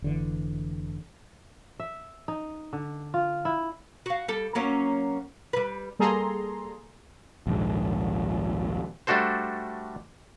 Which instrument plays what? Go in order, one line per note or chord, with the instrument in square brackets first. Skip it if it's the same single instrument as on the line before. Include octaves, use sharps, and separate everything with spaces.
[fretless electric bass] F1 D3 E3
[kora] E5
D#4
D3
F4
E4
[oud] F#4 F5
G3 A4
F#3 A#3 C#4
G3 B4
[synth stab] G3 A#3 G#4 A4 A#5 C6
[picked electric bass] A#1 D#2 G#2
[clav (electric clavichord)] G3 A3 D4 F#4 A4 C5